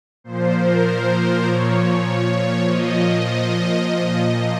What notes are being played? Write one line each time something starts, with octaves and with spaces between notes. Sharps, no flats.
A#2 F3 C5
A#4
C5
A#2 F3 C#5
A#2 F3 D#5